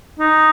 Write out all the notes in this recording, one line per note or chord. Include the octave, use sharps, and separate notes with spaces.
D#4